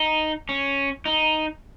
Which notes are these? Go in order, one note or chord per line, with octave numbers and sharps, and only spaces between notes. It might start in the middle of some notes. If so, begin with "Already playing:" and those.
Already playing: D#4
C#4
D#4